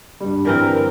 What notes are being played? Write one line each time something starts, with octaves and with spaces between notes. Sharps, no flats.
G2 G3
D3 E3 C4 A#4